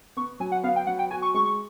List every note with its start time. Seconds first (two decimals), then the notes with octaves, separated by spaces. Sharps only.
0.17 B3 C#6
0.40 F#3 G#5
0.52 F#5
0.63 B3 F5
0.76 G5
0.87 F#3 F#5
0.99 G5
1.11 F#4 G#5
1.22 C#6
1.34 G#3 C#6
1.46 C#6